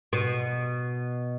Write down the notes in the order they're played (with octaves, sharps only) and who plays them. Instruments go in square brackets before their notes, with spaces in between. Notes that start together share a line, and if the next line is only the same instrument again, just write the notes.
[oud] B2